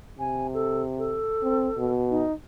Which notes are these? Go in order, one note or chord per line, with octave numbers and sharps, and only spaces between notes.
C3 G#5
A4
A4
C4
B2
D#4